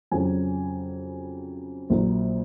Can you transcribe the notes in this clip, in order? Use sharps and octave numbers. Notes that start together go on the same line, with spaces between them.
F2 C#3 F#3 G#5
A#1 A#2 F#3